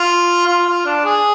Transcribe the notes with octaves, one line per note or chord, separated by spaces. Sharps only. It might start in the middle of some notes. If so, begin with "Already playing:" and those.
Already playing: F4
F4
F4
D4
G#4